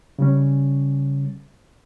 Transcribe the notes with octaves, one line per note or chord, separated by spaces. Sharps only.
C#3 G3 C#4